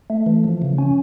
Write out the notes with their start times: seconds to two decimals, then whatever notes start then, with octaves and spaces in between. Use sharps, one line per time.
0.10 A3
0.26 E3
0.44 F3
0.62 C#3
0.78 C#4